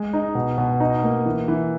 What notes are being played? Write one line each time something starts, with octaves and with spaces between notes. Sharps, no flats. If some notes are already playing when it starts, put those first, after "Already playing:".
Already playing: G#3
D#4
B2
B2
D#4
A#3
E3
E3